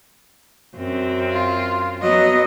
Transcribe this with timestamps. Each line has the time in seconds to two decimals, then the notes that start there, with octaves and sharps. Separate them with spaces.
0.76 F#2 C4
1.32 F4
2.01 F#3 B3 D#5